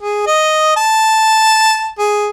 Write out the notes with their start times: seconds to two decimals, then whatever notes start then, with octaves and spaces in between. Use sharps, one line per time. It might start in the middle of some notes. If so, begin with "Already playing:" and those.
0.02 G#4
0.27 D#5
0.77 A5
1.98 G#4